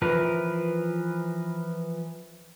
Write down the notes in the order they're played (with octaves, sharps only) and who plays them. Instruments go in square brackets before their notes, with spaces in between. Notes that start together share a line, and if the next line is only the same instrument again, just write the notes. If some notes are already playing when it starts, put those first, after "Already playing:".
[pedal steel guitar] E3 F3 A#4 B4